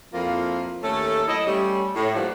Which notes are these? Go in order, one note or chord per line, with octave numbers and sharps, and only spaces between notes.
F2 F3 A#3 E4 F4
D#2 A3 C#4 A4
F#3 E4 A4 D#5
G3 A3 C#4
A2
E3 F3 G3 A#3 D4 F#4